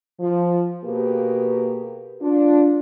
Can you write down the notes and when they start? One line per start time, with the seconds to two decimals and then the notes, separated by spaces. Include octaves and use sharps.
0.21 F3
0.85 B2 A#3 G4 G#4 B4
2.22 D4 F4